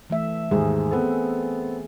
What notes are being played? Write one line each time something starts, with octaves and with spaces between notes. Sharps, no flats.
E3 A3 E5
D#2 G#2 G#4
B3 C4 A4